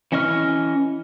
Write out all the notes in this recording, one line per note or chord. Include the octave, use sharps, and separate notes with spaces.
E3 C#4 D#5 C#6 F6